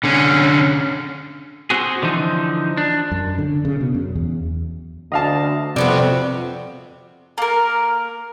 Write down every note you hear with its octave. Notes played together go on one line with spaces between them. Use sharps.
D3 C#4
C4 F#4 G#4
D3 E3 F3 D#4
D4
F#2
D3
C#3
B2
F#2
E2
D2 D#5 F5 A5
F2 C3 G3 B3 F#4
A#3 A#4